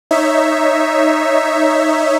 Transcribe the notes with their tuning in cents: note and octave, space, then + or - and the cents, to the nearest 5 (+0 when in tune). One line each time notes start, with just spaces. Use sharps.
D#4 +0 C#5 +0 E5 +0